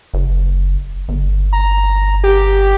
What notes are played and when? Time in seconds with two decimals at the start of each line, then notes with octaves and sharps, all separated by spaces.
0.14 F#1
1.09 G1
1.53 A#5
2.24 G4